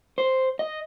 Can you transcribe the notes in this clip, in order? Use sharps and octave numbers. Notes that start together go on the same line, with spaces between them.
C5
D#5